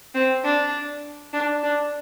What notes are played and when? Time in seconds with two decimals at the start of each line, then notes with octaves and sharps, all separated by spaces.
0.15 C4
0.45 D4
1.33 D4
1.63 D4